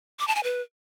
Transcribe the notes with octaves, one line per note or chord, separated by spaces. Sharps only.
D6
A5
G#5
B4